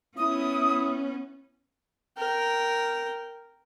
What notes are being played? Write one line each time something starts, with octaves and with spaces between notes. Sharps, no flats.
B3 C#4 E4 D#6
A#4 G5